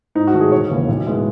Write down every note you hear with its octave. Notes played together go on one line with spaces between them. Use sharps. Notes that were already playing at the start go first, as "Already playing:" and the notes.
G#2 D#4
F#4
D#3 A3
G#4
E1 C#5
D#2 C#3 E3 B3
B1
A2 G#3 B3